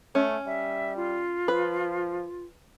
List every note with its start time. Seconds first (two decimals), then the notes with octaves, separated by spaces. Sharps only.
0.15 A3 C#4
0.46 G3 E5
0.96 F4
1.48 F3 B4